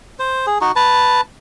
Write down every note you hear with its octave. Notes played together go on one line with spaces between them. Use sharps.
C5
G#4
D#4 F#4
B4 A5